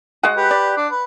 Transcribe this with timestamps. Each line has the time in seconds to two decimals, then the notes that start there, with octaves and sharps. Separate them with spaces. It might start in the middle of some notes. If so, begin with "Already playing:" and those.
0.23 G#3 F#4 G#4 F#5
0.37 G4 B4
0.51 D5
0.77 D4
0.91 B4